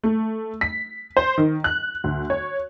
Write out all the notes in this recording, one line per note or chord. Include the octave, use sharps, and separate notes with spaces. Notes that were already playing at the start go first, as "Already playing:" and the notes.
A3
B6
C5
D#3
F#6
D2
C#5